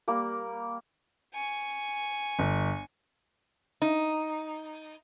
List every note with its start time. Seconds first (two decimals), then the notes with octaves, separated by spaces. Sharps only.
0.08 G3 A#3 A#4
1.34 G#5 C#6
2.39 G1
3.82 D#4